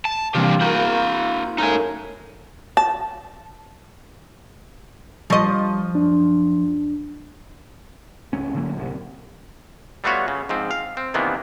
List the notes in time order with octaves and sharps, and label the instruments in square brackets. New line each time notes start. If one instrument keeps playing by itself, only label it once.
[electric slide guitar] A5
[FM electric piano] C3 E3 G3 [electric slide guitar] A#3 D4 G4 [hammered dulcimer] C4 F4
[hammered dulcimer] A#3 [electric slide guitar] E4 F#4 [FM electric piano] A#5 B5 G6
[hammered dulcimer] F#2 A2 [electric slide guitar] D#4 G#5
[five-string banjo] A5
[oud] F3 D#5 [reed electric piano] G3 C#6
[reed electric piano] F#2 D4
[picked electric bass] C#2 A3 C#4
A2 D3 F#3 A#3
C2
[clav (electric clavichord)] G3 A3 B3 F4 F#4 C#5
C#3
G#2 F3 C4
F5
C4
C3 D#3 E3 A#3 B3 D4